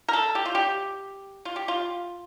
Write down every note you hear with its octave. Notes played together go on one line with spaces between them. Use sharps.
A#4
A4
G4
F4
G4
F4
G4
F4